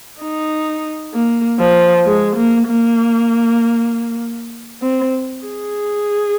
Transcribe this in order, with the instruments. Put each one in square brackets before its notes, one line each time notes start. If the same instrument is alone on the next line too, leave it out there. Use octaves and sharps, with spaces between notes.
[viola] D#4
A#3
F3
G#3
A#3
A#3
C4
G#4